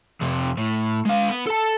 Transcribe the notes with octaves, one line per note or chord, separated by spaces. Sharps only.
F2 C3
A2
G#3 F5
B3
A4 A5